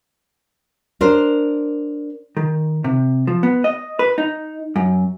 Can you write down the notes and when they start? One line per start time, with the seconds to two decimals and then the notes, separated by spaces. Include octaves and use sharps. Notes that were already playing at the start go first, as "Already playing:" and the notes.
1.01 D4 A#4 C5
2.37 D#3
2.84 C3
3.27 F3
3.43 B3
3.64 D#5
3.99 B4
4.18 D#4
4.76 F#2